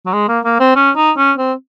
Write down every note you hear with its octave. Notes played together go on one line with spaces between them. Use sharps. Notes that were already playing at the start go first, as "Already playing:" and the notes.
F#3
G#3
A#3
A#3
C4
C#4
D#4
C#4
C4